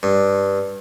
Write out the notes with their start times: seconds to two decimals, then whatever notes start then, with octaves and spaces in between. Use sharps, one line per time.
0.03 G2